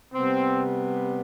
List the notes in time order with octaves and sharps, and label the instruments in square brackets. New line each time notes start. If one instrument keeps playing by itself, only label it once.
[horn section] C3 G3 B3 C4